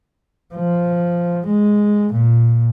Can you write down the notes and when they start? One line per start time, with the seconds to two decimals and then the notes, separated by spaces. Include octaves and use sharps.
0.55 F3
1.46 G#3
2.13 A#2